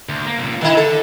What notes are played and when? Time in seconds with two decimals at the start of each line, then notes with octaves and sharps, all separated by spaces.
0.09 D2
0.27 A#3
0.39 C#2 A#2
0.61 D3 D#3 E4
0.77 A4